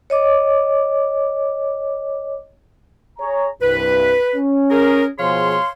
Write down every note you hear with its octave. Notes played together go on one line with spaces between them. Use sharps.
C#5 D#5 D6
G#4 C#5 A#5
C2 G2 B4
C#4
G#4 A#4
B2 F3 G#4 C#5 F5 C6